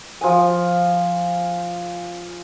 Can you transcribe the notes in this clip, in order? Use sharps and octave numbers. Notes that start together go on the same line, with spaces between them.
F3 G#5